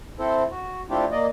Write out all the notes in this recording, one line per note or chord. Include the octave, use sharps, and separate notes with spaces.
C4 E4 A4 C5
F#4
A3 C4 D4 E4 F4 G4
A#3 D5 D#5